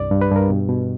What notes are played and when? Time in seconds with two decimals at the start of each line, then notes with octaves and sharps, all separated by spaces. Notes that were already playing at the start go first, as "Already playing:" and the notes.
Already playing: C2 G2 D5
0.11 G2
0.21 B4
0.31 G2 A#4
0.49 B2
0.69 B2